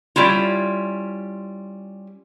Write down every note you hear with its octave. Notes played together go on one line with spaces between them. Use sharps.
G3 C#4 E4 F4